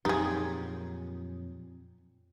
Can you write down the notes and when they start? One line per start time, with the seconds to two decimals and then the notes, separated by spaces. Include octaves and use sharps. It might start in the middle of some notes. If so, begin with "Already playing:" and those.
0.05 F2 A#2 F#3 D#4 G4 G#4 A#4